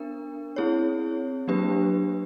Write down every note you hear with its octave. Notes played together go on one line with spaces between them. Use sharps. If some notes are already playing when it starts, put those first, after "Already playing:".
Already playing: B3 D4 A#4
C4 E4 G#4 C#5
F#3 A#3 D4 G4 B4